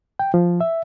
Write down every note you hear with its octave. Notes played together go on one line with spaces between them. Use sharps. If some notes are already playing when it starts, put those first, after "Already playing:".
G5
F3
E5